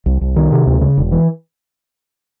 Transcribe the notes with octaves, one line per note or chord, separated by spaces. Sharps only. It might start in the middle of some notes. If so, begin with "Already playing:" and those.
C2
C2
D#3
C3
D2
C#3
E1
E3